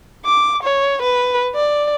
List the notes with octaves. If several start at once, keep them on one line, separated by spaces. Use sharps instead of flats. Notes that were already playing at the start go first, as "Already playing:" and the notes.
D6
C#5
B4
D5